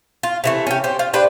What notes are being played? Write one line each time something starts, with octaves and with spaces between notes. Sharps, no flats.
F4
C3 E3 A3
C#4 G4
G4 C5
F4
D4 G4 B4 C5